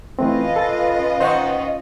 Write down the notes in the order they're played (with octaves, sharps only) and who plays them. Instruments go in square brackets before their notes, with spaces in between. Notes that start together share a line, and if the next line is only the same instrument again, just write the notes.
[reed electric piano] E3 A3 C4 [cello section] C#4 F4 D#5 [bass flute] B4
[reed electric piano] A4 A6
[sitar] D#3 D#4 [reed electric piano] C5 F#5 C#6